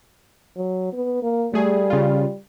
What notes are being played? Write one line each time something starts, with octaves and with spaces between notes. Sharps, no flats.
F#3
B3
A#3
G3 A3 G#4
C#3 F4